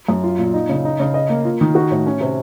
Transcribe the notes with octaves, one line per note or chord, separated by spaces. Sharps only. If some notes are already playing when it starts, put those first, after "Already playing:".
F#2
F4
A#2
D#4
C#3
D#4
C#3
D#5
A#3
F4
D#3
F#4
A2
C#4
C3